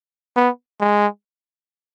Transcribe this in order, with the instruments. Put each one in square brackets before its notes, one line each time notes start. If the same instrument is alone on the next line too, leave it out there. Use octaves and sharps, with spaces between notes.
[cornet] B3
G#3